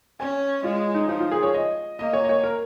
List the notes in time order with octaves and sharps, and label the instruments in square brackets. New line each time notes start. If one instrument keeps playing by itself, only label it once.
[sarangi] C#4 [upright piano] G#5
[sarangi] G#3 [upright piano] F4
[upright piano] D#4
[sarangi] F3 [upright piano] D#4
[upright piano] F4
G#4
C#5
D#5
[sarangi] A#3 [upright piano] D#5
[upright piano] C#5
D#5
C#5
A#4